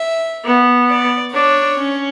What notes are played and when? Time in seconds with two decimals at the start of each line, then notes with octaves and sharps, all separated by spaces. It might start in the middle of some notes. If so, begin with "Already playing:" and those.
Already playing: E5
0.45 B3
0.90 D5
1.33 D4 C#5
1.78 C#4